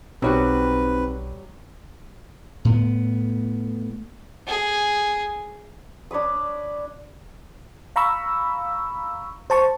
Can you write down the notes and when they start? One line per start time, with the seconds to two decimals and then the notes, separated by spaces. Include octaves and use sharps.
0.22 B1 F#3 G3 C4 D#4 F#4 B4
2.65 A2 B3
4.47 G#4
6.11 D4 C#5 B5 D#6
7.96 F5 A#5 B5 C#6 E6
9.50 C5 A5 C#6